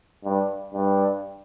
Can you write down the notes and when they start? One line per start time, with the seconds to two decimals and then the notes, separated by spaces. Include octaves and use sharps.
0.24 G2
0.74 G2